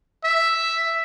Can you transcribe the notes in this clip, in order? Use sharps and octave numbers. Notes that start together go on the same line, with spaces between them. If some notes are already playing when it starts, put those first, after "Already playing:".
E5